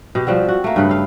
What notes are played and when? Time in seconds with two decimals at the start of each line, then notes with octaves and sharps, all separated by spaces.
0.15 B2 G4
0.27 F3 G3 C4 F#4
0.49 F#4
0.64 A3 A#3
0.76 G2 C#3 B4
0.89 A4 F5